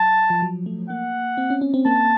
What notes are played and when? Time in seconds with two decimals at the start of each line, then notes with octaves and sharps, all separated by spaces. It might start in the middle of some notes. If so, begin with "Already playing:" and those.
Already playing: F#3 A5
0.30 F3
0.42 F#3
0.66 A3
0.90 A#3 F#5
1.37 C4
1.50 C#4
1.61 C#4
1.74 C4
1.85 A#3 A5